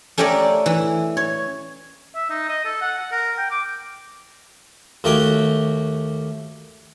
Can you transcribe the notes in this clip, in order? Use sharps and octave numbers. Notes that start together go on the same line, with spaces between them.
A3 C#4 G4 A#4 C#5 D5
E3
C#5
E5
D#4
D#5
A4
F#5
F#5
A#4
G5
D6
D#2 A3 F#4 G4 G5 G#5